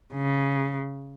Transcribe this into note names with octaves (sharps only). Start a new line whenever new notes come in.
C#3